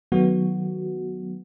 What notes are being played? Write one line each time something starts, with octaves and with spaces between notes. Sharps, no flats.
D#3 F#3 A3 B3 F#4